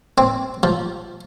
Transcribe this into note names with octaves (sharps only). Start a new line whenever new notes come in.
C4
F3